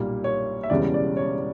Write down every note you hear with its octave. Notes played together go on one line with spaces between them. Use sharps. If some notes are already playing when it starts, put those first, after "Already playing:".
Already playing: B1 A#2 G3 A#3
C#5
E5
E1 E2 C#3 G3 D5
D5
C#5